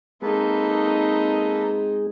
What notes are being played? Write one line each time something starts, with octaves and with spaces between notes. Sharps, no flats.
G#3 A#3 C4 D#4 G#4 A4 B4